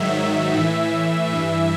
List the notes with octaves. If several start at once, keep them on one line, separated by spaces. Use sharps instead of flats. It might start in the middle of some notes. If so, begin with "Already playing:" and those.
Already playing: G#2 D#3 F#3 E5
A2 E3
G2 E3